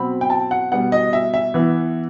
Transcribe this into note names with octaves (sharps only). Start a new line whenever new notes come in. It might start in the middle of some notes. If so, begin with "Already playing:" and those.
Already playing: B2 F#3 C4 B5
G5
A5
F#5
B2 G3 B3 F#5
D#5
E5
E5
E3 B3